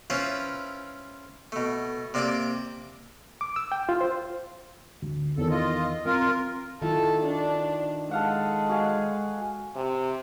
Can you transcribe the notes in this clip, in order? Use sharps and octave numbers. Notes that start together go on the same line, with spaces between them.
C#4 E4 F4 B4 C5
B2 A3
C3 A#3 D5 D6
D6
E6
G5
F4
C5
D2
E2 D#3 A4
F4 D#5
C4 F4 A#4
D#3 E4 F4 A4
D4
G#3 A4 F5 F#5
F#4 G#4 F5
C3